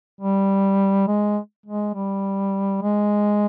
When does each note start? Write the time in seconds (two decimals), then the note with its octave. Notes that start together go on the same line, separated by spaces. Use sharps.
0.21 G3
1.07 G#3
1.66 G#3
1.95 G3
2.82 G#3